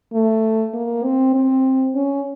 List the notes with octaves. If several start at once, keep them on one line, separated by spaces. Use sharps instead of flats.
A3
A#3
C4
C4
C#4